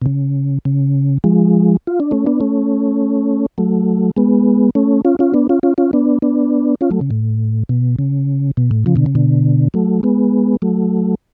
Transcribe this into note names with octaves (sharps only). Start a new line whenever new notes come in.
B2
C#3
C#3
F3 G#3
F4
D4
A3 C#4
B3 D4
A3 C#4
F#3 A3
G#3 B3
A3 C#4
C#4 F4
C#4 F4
B3 D4
C#4 F4
C#4 F4
C#4 F4
B3 D4
B3 D4
C#4 F4
F#3 A3
C#3
A2
B2
C#3
B2
A2
C#3 F3
B2 D3
C#3
B2 D3
F#3 A3
G#3 B3
F#3 A3